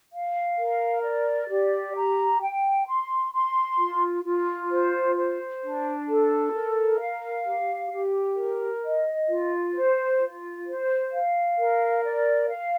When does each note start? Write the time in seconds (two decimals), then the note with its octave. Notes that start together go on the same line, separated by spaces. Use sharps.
0.12 F5
0.58 A#4
1.03 D5
1.49 G4
1.95 A#5
2.42 G5
2.87 C6
3.33 C6
3.79 F4
4.25 F4
4.70 C5
5.16 C5
5.62 D4
6.08 A4
6.54 A#4
7.00 F5
7.46 G4
7.91 G4
8.37 A#4
8.83 D#5
9.28 F4
9.75 C5
10.20 F4
10.66 C5
11.12 F5
11.58 A#4
12.04 D5
12.49 F5